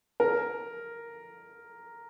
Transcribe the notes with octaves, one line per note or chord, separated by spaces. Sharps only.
A#4